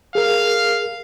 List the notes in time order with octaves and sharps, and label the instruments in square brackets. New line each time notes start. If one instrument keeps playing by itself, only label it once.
[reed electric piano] G#4 A#4 [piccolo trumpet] F5